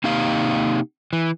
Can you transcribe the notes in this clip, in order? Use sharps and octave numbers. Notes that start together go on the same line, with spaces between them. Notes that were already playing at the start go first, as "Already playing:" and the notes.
C3 A#3 D#4 G4 F5
E3